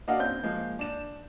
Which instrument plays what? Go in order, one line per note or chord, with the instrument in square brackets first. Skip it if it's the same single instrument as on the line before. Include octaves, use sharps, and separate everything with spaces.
[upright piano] A#3 D4 F#4 D#5 F5 F#5
C4 C#4 G6
F3 G#3 A#3
D4 E7